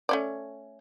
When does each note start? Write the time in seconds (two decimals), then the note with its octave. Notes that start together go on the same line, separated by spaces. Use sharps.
0.09 A3 C#4 D5